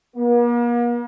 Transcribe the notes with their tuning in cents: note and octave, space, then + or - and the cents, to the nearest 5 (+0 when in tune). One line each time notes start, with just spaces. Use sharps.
A#3 +45